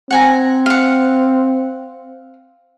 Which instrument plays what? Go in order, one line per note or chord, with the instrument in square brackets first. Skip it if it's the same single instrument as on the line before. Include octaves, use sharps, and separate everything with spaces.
[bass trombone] C4 [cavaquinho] F#5 G#5 A#5
[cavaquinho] F5 F#5